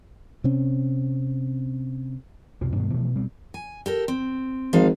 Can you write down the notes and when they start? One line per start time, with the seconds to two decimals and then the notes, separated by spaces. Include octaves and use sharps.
0.44 C3 C4 C#4
2.61 C2 F2 B2 F3
2.76 G2 B2 D#3 G#3
2.94 B2 E3 F3 A3
3.15 B2 G3 C4
3.54 G#5
3.86 G4 A4 A#4
4.08 C4
4.73 G#1 F3 F5